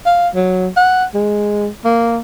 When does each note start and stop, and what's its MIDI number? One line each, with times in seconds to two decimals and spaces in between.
0.06 0.28 77
0.35 0.69 54
0.77 1.05 78
1.14 1.68 56
1.85 2.20 58